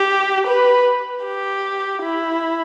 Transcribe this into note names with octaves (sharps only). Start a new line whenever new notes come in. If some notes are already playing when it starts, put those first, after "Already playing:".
Already playing: G4
B4
G4
E4